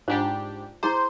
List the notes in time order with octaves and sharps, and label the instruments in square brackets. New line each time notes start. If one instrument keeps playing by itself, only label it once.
[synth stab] G#2 D4 G4 [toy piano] F4 C5
[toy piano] E4 G#4 A#5 [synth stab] C5